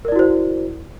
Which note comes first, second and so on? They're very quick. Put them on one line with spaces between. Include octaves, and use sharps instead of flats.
A#4 D5 E4 F#4 C5